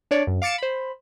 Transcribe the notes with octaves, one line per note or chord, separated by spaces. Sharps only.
D4 C#5 D5
F#2
F5 D6 A6 C#7 E7
C5 B5